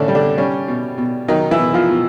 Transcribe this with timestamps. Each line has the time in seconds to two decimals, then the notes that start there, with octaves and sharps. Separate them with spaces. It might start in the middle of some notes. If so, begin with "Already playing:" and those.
Already playing: A2 D3 C#4 D4
0.08 G3
0.15 D3 D4
0.38 G3 C#4
0.68 B2
0.98 B2
1.28 D#3 F#3 D#4
1.51 E3 E4
1.59 B2
1.74 F3 F4
1.89 B2